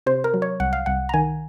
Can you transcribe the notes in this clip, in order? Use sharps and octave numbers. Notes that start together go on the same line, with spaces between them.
C3 C5
A#4
F#3
C#5
C2 F#5
F5
C2 F#5
A#5
D#3 G#5